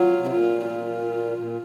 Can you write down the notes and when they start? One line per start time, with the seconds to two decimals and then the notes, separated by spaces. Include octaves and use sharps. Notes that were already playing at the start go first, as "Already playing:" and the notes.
Already playing: F#3 F4
0.20 C3
0.30 A#2 F4
0.66 F4
1.38 A#2